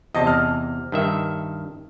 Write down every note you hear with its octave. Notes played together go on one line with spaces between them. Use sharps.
E2 C3 D#5 A5
F6
G2 D#3 E5